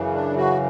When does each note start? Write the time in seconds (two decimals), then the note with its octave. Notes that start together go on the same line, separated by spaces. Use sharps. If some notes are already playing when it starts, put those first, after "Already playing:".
Already playing: F#2 C#3 E3
0.14 D4
0.37 F#4